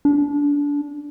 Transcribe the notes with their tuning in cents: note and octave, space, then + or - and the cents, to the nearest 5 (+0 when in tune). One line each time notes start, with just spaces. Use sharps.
D4 -25